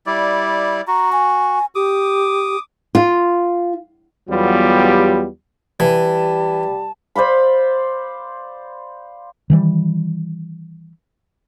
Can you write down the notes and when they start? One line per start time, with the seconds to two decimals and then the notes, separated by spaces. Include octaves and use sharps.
0.06 G3 E4 D5
0.88 F#4 A#5
1.12 G#5
1.75 G4 D6 D#6
2.95 F4
4.29 E2 F#3 G3 B3 F4 G4
5.80 E3 G3 A5
7.15 C5 D5 F5 B5
9.50 D#3 E3 G3